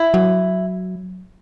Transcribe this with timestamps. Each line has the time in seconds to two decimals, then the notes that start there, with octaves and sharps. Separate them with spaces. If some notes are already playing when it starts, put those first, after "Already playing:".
Already playing: E4
0.14 F#3